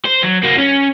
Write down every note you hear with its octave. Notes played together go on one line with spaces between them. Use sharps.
C5
F#3
A#3 F#4
C#4